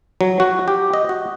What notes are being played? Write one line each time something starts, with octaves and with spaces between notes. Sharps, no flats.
F#3
F#4
G4
D#5
F#4